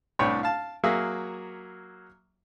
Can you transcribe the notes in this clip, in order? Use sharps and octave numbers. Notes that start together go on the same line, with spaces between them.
C2 A2 D4 B4 C#5 G5
F5 A5
F#3 A#3 F#4 G#4 E5 F5